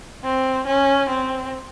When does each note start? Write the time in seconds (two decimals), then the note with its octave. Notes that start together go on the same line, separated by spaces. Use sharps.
0.24 C4
0.66 C#4
1.09 C4